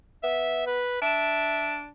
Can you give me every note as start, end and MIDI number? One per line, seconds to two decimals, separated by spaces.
0.24 0.81 59
0.24 0.62 76
0.67 0.99 71
1.02 1.89 62
1.02 1.79 76